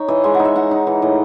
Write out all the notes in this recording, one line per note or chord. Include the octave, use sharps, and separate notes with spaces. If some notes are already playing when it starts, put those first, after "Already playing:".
Already playing: D#4 C#5
E3 D#5
G#3 G#5
F#5
D#4
E5
D#4 F#5
D#4
E3
A2 D#5